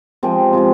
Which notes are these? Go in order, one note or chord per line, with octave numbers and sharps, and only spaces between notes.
F3 G#3 C4 G4
C3 F3 G#3